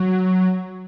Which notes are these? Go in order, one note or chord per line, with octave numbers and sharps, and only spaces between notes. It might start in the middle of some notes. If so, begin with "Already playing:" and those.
Already playing: F#3